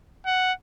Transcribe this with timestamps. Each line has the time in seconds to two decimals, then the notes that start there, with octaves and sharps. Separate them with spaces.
0.26 F#5